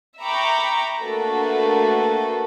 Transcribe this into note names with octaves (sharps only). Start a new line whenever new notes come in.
E5 G5 A#5 B5 C#6 D6
A3 A#3 D4 F#4 A4 B4